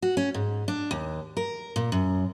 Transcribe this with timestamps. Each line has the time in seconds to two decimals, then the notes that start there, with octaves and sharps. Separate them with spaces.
0.02 F#4
0.17 C#4
0.34 G#2
0.68 D4
0.91 D#2
1.37 A#4
1.76 A#2
1.92 F#2